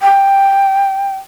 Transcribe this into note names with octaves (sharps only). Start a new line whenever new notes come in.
G5